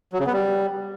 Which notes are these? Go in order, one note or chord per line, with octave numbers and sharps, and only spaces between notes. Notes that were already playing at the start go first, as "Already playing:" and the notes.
F#3
C#3
B3
G3